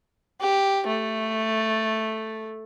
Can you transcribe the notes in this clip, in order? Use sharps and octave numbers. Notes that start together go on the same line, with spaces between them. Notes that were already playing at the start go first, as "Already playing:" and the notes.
G4
A3